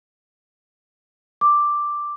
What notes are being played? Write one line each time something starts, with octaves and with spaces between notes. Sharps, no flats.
D6